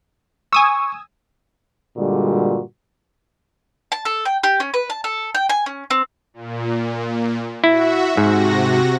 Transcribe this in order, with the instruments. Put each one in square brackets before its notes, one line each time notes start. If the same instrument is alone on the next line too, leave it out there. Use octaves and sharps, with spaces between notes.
[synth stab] G#5 D#6 E6 [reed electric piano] C#6
[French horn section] G2 A#2 D3 G3 G#3 F#4
[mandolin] A5
A4
G5
G4
C#4
B4
A5
A4
G5
G#5
C#4
C4
[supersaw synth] A#2
[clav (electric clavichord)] E4 [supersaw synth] F#4 E5
[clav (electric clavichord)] G#2 [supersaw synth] C3 F#4 A#6